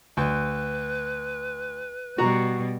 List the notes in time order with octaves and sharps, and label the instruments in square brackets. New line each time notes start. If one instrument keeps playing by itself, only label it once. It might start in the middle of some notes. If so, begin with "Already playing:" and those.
[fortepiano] D2 [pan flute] B4
[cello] B2 G3 [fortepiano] F#4 A#5